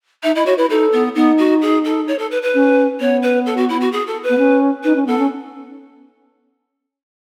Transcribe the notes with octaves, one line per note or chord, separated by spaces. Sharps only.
D#4 E5
E4 D#5
F#4 C#5
E4 B4
D#4 A4
B3
B3 D#4
F#4
G#4
A4
C#5
A4
B4
B4
C#4
B3 C#5
B4
A4
F#4
E4
F#4
G#4
A4
B4
B3
C#4
D#4 B4
C#4
B3 A4
C#4